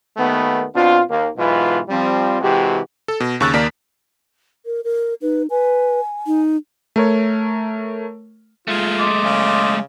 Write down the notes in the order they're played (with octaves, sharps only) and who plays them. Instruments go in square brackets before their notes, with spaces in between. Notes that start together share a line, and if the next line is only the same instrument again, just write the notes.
[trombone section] D#2 D#3 A3 B3
B2 C4 D4 F4
D#2 A#3
B1 G#2 B2 E3 F4 B4
F3 G3 C4
C3 E3 G#3 F#4 G4
[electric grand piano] A4
B2
D#2 C#3 C#6 E6 F#6 A6
D#2 A#3 A#4 D5 B6
[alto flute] A#4
A#4
[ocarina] D#4 [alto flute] B4
[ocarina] B4 [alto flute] G#5
[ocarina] D#4
[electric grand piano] A3 A#4 C#5
[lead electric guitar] G#3 A3 [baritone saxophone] F4
[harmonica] D#5 C6 D6
[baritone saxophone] C#3